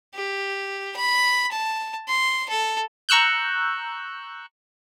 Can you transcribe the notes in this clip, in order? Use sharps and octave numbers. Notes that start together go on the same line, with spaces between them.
G4
B5
A5
C6
A4
A#5 C#6 E6 F#6 G6